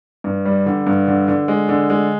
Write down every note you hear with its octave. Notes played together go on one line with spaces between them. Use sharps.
G2
G3
D3
G2
D3
D3
G#3
D3
G#3